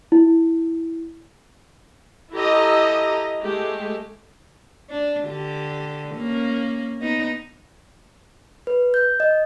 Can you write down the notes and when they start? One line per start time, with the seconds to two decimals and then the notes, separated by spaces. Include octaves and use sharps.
0.12 E4
2.33 E4 G4 A4 D#5 A#5
3.43 G#3 A3 G4
4.90 D4
5.27 D3 G4
6.15 A#3 C#4
7.02 B3 D#4
8.67 B4
8.94 G6
9.20 D#5